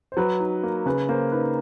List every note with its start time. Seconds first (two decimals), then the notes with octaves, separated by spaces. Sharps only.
0.12 C5
0.17 F#3 B4
0.40 D#4
0.63 A#3
0.86 C#3 B4
1.09 A#3 C5
1.32 D#4 B4